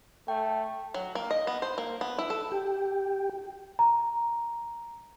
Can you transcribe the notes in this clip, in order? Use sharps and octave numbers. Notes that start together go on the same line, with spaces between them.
A3 G5
F#3
A#3
D#5
B3
C5
A#3
B3
E4
A4
G4
A#5